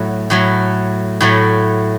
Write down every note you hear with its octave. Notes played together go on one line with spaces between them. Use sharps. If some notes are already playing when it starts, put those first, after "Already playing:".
Already playing: A2 F#3 A3
A2 F#3 A3
A2 F#3 A3